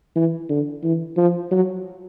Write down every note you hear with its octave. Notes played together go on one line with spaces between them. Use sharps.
E3
D3
E3
F3
F#3